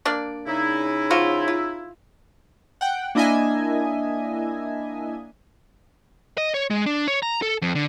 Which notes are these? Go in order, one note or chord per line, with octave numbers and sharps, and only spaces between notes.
A#3 D4 D5
C#3 D#4 E4
F3 F4 F#4
F4
F#5 G5
A#3 D4 E4 D#5 E5 G#5
D#5
C#5
G#3
D4
C#5
A#5
A4
F2
D3